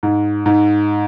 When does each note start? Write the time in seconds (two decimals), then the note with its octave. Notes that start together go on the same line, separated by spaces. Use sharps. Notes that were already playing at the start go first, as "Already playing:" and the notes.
0.03 G#2
0.46 G#2